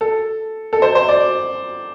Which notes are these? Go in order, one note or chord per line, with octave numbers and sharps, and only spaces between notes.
A4
A4
C5
C5
D5